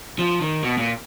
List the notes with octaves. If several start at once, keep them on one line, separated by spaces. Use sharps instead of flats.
F3
D#3
B2
A#2